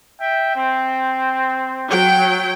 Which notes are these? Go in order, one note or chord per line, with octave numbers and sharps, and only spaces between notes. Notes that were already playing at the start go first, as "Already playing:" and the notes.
E5 G5
C4
F#3 G5